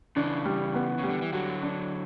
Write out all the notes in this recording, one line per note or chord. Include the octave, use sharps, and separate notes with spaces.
C#3 E3 D4
G3
B3
C#3
G3
D3
E3
D3 F#3 F#4
D4